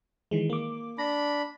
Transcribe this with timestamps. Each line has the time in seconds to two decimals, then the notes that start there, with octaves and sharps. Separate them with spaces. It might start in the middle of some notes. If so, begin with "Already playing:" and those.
0.31 D#3 E3 G#3
0.50 A#3 D6
0.98 D4 B5 A#6 B6